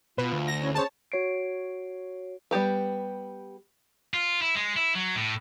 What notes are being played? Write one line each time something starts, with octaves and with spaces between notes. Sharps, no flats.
B2 F4 B4
D2
A#6
C#4 E4 C#5
C#4 G#4 C5 C#5 A5
F#4 C#5 C7 D7
G3 B3 G4 B4
F4
E4
G#3
E4
F#3
A2